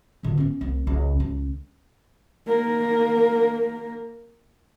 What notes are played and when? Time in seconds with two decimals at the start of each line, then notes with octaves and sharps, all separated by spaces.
0.23 A#2 D3
0.37 B3 C#4
0.61 C2 A3
0.87 C#2
1.20 C#2
2.47 A#3 A#4